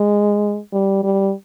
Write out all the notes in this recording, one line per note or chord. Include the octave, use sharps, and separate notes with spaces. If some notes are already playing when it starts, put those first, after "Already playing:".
Already playing: G#3
G3
G3